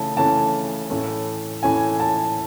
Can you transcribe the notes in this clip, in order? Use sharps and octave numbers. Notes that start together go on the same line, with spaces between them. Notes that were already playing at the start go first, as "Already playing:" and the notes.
Already playing: C#3 E3 A3 C#4 A5
C#3 E3 A3 C#4 A5
A2 E3 A3 C#4
A2 E3 A3 C#4 G#5
A5